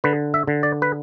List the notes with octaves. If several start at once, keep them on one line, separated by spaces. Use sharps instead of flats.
D3 B4
E5
D3
D5
B4